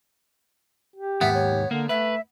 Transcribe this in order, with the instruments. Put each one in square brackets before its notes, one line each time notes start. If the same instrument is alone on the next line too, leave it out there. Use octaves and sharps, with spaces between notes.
[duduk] G4
[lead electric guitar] D#2 G#2 [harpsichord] B3 [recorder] E5
[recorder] C#5
[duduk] D3 [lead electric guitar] A#3
[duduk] A3 [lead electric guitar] B4 [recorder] E5